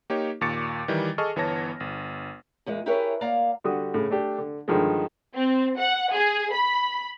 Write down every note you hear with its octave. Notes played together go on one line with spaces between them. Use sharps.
A#3 D#4 G4 C#5
D#2 A#2 C#6 D6 A6 C#7
D#3 E3 G3
G#4 A4 D#5 A5 C#6 F6
G1 E3 B3 C#5 A5 A#6
G1
E2 A#2 G#3
E4 G4 G#4 A#4 B4 C#5
A#3 D5 F5 A#5
D3 G3 F#4 D#6
A2 C#3
A3 D4 G4
D3
G2 D3 D#3 F3 G#3
C4
F#5
G#4
B5